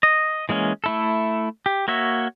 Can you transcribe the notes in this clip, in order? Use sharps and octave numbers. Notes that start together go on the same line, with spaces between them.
D#5
E3 G#3 A#3 C#4
A3 E4 A4
G4
A#3 F#4 C#5 E5